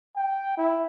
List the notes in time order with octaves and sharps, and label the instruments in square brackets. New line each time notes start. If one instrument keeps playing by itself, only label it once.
[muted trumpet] G5
E4